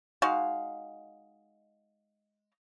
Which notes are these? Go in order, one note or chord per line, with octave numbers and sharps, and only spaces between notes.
G#3 D#4 F#4 F5